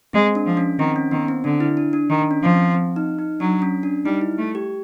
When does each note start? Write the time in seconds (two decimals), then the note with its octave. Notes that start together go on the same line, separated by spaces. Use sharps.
0.13 G#3 C4
0.35 D4
0.46 F3
0.57 C#4
0.79 D#3 C4
0.96 C#4
1.11 D#3 B3
1.28 C4
1.44 D3 D4
1.60 E4
1.77 D4
1.93 D4
2.10 D#3 D4
2.31 C#4
2.42 F3
2.53 C4
2.75 C4
2.96 D#4
3.19 D#4
3.40 F#3 D4
3.62 C#4
3.83 D4
4.05 G3 D#4
4.21 E4
4.38 A3
4.55 G4